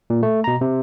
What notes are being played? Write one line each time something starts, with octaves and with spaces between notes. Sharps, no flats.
A#2
A3
B2 A#5
C3